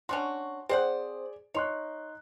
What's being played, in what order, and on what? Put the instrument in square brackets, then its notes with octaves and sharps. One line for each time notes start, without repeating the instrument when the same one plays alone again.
[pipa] C#4 D4 F#4 [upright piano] C6
[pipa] C4 C5 F#5 [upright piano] G#4 D5
[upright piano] D#4 C6 F#6 [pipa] C#5